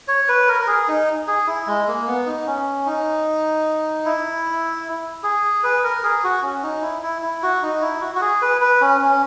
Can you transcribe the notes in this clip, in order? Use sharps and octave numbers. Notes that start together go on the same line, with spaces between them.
C#5
B4
A#4
A#4
G#4
D#4
G#4
E4
G#3
A#3
B3
D#4
C#4
D#4
E4
G#4
B4
A#4
G#4
F#4
C#4
D#4
E4
E4
E4
F#4
D#4
E4
F#4
F#4
G#4
B4
B4
C#4
C#4